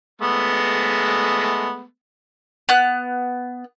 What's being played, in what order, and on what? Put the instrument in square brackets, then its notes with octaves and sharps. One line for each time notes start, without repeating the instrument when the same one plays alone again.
[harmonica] G#3 A3 B3
[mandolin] B3 F#6